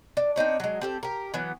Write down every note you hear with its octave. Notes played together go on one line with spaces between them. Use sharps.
D4
C4 D4 D#4 C#5
F#3 G#3
C4 G4 A4
G4 A#4
E3 F#3 B3